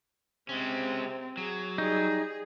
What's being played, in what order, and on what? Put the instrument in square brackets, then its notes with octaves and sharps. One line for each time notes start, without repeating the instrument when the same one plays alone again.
[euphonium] C3 [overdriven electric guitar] G#3 C#4 [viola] C4
[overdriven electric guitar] F#3 [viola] G#4
[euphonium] G3 [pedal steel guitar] D#4 [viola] G#4